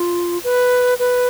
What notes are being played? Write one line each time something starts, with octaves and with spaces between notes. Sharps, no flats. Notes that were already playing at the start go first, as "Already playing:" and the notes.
Already playing: F4
B4
B4